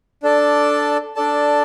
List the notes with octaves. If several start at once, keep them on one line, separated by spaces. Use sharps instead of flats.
D4 A4 D5 A5
D4 A4 D5 A5